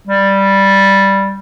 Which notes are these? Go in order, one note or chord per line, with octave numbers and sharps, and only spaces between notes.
G3